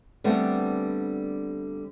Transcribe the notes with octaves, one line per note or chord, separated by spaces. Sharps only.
D3 G3 A3 B3 C4 D4